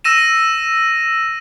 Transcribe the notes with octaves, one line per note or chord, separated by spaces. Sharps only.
E6 A#6 D#7 E7